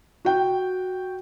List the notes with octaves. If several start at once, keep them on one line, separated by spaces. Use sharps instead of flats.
F#4 G5